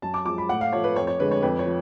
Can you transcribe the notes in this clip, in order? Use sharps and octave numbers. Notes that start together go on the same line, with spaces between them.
F#2 A5
D6
F3 G#3 D6
B5
A2 F#5
F5
F3 A3 C#5
B4
F2 C#5
C#5
D3 G#3 B4
C#5
F2 B4
C#5
F3